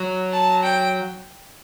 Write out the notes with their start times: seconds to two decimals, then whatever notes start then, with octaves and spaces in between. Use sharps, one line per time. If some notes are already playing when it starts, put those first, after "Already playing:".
Already playing: F#3
0.32 A5
0.63 G5